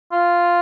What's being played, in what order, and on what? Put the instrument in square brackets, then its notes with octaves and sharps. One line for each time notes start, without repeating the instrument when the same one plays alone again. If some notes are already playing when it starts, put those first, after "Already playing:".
[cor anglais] F4